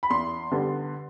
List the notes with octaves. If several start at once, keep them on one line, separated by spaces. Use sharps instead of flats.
B5
E2 C6
D3 G3 B3